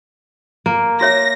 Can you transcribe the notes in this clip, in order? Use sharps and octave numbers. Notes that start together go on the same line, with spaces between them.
A#3
F#4 C#5 E5 A#6